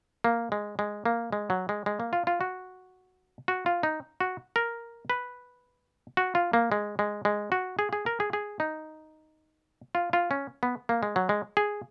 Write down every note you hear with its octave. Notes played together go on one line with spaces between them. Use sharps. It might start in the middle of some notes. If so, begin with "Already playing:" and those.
A#3
G#3
G#3
A#3
G#3
F#3
G#3
G#3
A#3
F4
F4
F#4
F#4
F4
D#4
F#4
A#4
B4
F#4
F4
A#3
G#3
G#3
G#3
F#4
G#4
G#4
A#4
G#4
G#4
D#4
F4
F4
C#4
B3
A#3
G#3
F#3
G#3
G#4